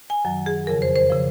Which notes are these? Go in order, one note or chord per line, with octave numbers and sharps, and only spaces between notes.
G#5
F#2 D#3 F#3
G#4
F2 C#3 F3 A#4
C5
C5
C#3 F3